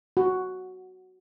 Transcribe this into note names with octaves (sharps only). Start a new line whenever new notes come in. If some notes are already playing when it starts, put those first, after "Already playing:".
F#4